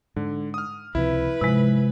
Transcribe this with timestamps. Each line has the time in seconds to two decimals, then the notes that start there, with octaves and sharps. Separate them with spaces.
0.16 G#2 D3
0.54 D#6 F6
0.95 C#2 C3 F3 E4 B4
1.41 G#2 C3 F3 G#3